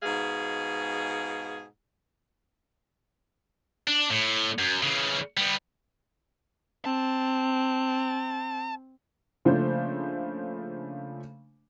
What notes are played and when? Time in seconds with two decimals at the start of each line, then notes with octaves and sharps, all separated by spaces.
0.03 G#2 B2 G#4 F5
3.87 D4
4.11 A2
4.59 F#2
4.83 C#3 E3
5.37 G3 B3
6.85 C4 A5
9.45 C#3 F3 A3 A#3 D4 C5